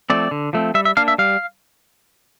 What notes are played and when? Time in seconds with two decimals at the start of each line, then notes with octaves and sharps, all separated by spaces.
0.10 F3 A3 C4 D5
0.31 D3
0.53 F3 A3 C4
0.74 G3 E5
0.85 E5
0.97 A#3 D4 F5
1.08 E5
1.18 G3 F5